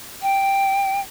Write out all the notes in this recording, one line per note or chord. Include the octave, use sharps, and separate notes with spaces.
G5